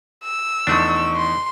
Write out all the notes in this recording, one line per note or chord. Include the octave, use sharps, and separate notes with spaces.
E6
E2 F3 A3 D4 D#4 C#6
C6